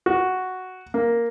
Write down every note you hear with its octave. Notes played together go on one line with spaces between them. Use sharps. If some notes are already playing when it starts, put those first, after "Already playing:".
F#4
A#3